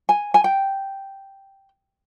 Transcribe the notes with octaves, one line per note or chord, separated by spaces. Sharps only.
G#5
G#5
G5